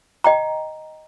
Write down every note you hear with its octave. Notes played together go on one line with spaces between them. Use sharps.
D#5 G5 A#5